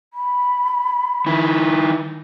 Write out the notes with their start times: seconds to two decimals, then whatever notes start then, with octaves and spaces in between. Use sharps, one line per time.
0.13 B5
1.26 D#3 E4